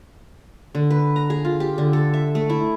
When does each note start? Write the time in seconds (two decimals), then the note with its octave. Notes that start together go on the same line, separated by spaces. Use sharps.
0.75 D3
0.91 B4
1.16 A#5
1.30 G#4
1.45 F4
1.60 G4
1.78 D3
1.93 A4
2.14 E5
2.35 A3
2.50 E4